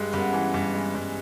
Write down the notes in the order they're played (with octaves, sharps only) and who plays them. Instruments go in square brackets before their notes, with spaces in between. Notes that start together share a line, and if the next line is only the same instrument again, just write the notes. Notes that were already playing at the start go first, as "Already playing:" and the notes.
Already playing: [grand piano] G2 G#3
[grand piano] G2 [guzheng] B3 C#4
[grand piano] E3
G2
G#3
G2